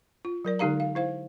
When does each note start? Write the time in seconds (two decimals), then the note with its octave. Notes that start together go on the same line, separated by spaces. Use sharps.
0.25 F4
0.45 F#3 A#4 D5
0.59 D3 G#3 D#4 G4 F5 A#5
0.80 F5
0.95 E4 C5 F5